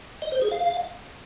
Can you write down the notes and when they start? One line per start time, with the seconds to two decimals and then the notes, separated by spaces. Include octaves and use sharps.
0.22 D#5
0.32 C5
0.42 G#4
0.51 F5